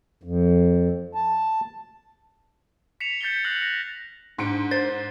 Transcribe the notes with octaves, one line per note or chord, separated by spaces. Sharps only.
F2
A5
B6 C#7 E7 F7
G6 A6 B6 C#7 G7
F6 F#6 A#6 C7 C#7 F#7
A#6
G#2 D4 C#7 D7
C5 A6